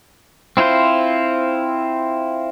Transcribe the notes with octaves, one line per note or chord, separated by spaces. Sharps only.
C4 E4 F4 C5